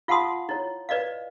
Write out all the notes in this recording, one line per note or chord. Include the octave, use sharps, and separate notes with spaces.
F4 F5 F#5 A5 C6 D#6
E4 C#5
B4 D5 D#5 F5